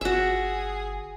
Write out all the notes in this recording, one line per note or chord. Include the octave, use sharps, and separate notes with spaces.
G1 F#4 G#4 E5